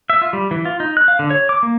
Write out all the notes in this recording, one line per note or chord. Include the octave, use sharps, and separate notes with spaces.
E5
F4
G3
E3
F4
D#4
F#6
F5
D3
C#5
D6
A#3